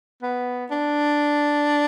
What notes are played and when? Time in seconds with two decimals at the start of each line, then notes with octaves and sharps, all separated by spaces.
0.23 B3
0.71 D4